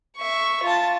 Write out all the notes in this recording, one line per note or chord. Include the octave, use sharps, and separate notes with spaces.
E5 C#6
F4 A5